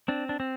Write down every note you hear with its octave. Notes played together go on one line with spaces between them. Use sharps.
C4 D4
D4
C4